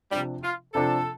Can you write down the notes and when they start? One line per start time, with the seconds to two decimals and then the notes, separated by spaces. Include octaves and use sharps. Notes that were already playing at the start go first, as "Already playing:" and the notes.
0.11 C3 F3 G3 D4
0.43 F4
0.74 C3 F3 D4 A4